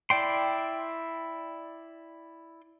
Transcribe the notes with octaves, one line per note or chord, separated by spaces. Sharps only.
E4 D5 G5 C6